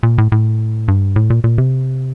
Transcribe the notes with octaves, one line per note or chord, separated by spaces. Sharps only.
A#2
A2
A2
G2
A2
A#2
A#2
C3